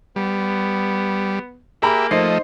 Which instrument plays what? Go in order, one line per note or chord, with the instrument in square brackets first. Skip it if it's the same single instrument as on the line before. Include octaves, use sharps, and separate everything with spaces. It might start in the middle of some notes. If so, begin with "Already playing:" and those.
[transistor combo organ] G3 [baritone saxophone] B3
[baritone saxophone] A#3 [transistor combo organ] G4 E5 [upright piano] G#4 A#5 B5
[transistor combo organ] F3 A3 D#5 [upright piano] D#4 C5 C7